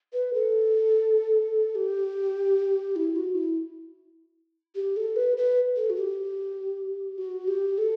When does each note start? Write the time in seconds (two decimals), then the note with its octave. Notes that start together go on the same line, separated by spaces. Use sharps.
0.13 B4
0.34 A4
1.75 G4
2.96 E4
3.16 F#4
3.35 E4
4.76 G4
4.97 A4
5.16 B4
5.37 B4
5.77 A4
5.90 F#4
5.96 G4
7.18 F#4
7.48 G4
7.78 A4